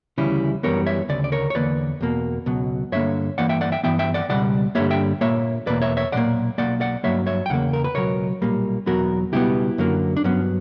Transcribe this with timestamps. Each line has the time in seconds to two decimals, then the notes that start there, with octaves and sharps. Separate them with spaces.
0.18 D2 C#3 E3 G3 C#4 E4
0.63 F#2 E3 G3 B3 A#4 C#5
0.86 C#5 E5
1.09 D2 C#3 D5
1.24 D5
1.32 A#4 C#5
1.50 C#5
1.55 E2 D3 A#3 B4 D5
2.01 E2 B2 A#3
2.46 C#2 B2 F#3
2.92 G2 D3 A#3 C#5 E5
3.38 G2 E3 A#3 D5 F#5
3.49 E5 G5
3.61 D5 F#5
3.72 E5 G5
3.84 G2 E3 B3 E5 G5
3.99 E5 G5
4.14 D5 F#5
4.29 C#2 B2 G3 D5 F#5
4.75 G2 D3 G3 A#3 C#5 E5
4.90 E5 G5
5.21 A#2 F#3 A#3 C#5 E5
5.67 E2 B2 A#3 B4 D5
5.82 C#5 E5
5.97 C#5 E5
6.12 B1 A#2 A#3 D5 F#5
6.58 B1 A#2 A#3 D5 F#5
6.81 D5 F#5
7.04 G2 F#3 A#3 C#5 E5
7.27 C#5 E5
7.46 G5
7.49 E2 C#3 A#3 F#5
7.73 A#4
7.84 B4
7.95 C#2 B2 F#3 A#4 C#5
8.42 B1 A#2 G3 A#3
8.86 E2 B2 F#3 B3 F#4 A#4
9.32 C#2 B2 G3 B3 E4 G4
9.78 F#2 D3 F#3 A#3
10.17 D4
10.24 G2 F#3 B3 C#4